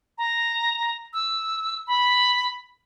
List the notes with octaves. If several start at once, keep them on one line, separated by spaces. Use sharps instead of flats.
A#5
E6
B5